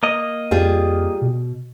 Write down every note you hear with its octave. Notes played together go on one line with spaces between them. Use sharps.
A#3 D#5
F2 G3 F4 G#4
B2